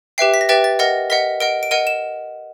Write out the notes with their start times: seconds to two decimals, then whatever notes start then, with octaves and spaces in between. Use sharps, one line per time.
0.18 G4 B4 E5 G5 C7
0.34 B6
0.41 A#6
0.49 G4 B4 E5 G5 A6
0.64 A6
0.79 A#4 D#5 F#5 A#6
1.10 A#4 D#5 F#5 B6
1.40 A#4 D#5 F#5 D7
1.63 D7
1.71 A#4 D#5 F#5 D#7
1.87 E7